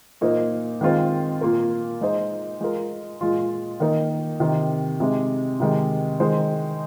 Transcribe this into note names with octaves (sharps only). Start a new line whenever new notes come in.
A#2 A#3 D#4 C5
D#3 G#3 C4 F4 C5
A#2 A#3 F4 A#4
G#3 D#4 C5
G#3 F4 A#4
A#2 G#3 F4
D#3 A#3 D#4 A#4
C3 D#3 C4 D#4
C3 G#3 D#4
C3 D#3 G#3
D#3 G#3 D#4 C5